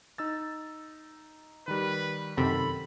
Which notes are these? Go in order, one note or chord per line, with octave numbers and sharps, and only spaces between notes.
D#4 E6 A6
D#3 G3 B4
F#2 C3 D#3 A4 B5